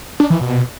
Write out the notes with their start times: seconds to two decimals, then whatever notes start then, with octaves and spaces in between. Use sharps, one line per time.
0.20 D4
0.30 E3
0.40 B2